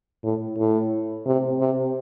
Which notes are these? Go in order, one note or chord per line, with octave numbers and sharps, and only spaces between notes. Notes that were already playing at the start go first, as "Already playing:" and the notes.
A2
A2
C3
C3